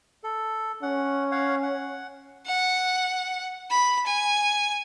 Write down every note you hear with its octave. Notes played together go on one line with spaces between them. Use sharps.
A4
C#4 F#5
C#5 F5 F#5
F#5
F#5
B5
G#5